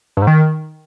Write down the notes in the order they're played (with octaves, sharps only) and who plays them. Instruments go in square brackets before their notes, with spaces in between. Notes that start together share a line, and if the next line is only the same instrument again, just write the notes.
[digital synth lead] G2
G#2
D#3